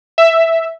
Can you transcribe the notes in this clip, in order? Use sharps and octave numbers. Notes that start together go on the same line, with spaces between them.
E5